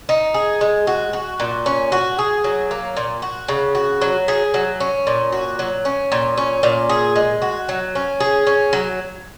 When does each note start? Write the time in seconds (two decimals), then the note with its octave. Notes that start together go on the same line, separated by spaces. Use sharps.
0.09 D#4
0.34 G#4
0.61 G#3
0.87 F#4
1.13 F#4
1.40 A#2
1.66 C#4
1.92 F#4
2.19 G#4
2.44 F#3
2.71 A#3
2.97 A#2
3.22 F#4
3.48 C#3
3.75 F#4
4.02 F#3
4.28 G#4
4.54 F#3
4.80 C#4
5.07 A#2
5.32 F#4
5.59 F#3
5.85 C#4
6.12 A#2
6.37 C#4
6.63 A#2
6.89 G#4
7.16 G#3
7.42 F#4
7.69 F#3
7.95 C#4
8.20 G#4
8.47 C#4
8.73 F#3